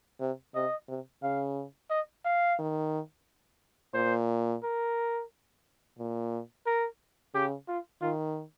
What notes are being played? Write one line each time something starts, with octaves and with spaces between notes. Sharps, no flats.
C3
C3 D#5
C3
C#3 F5
D#5
F5
D#3
A#2 C5
A#4
A#2
A#4
C#3 G4
F4
D#3 F4